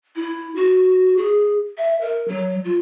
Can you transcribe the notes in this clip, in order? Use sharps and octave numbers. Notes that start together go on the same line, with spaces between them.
E4
F#4
G#4
E5
A#4
F#3
F4